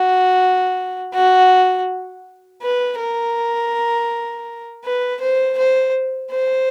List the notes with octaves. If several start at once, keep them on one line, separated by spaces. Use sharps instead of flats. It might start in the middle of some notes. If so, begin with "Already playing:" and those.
Already playing: F#4
F#4
B4
A#4
B4
C5
C5
C5